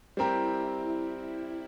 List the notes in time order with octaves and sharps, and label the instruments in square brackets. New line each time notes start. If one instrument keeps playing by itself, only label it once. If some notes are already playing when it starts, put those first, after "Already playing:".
[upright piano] G3 C4 G4 A#4 [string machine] E4